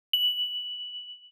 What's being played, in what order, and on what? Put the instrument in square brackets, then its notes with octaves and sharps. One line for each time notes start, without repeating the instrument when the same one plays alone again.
[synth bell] F#7